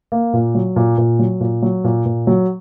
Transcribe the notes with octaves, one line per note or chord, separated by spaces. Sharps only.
A#3
A#2
F#3
A#2
A#2
F#3
A#2
F#3
A#2
A#2
F#3